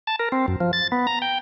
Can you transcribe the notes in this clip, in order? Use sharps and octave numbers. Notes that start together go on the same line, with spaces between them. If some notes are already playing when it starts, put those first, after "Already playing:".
A5
A#4
C4
F#2
F3
A6
B3
A#5
G5